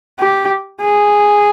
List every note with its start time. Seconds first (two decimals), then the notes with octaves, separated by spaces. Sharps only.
0.19 G4
0.81 G#4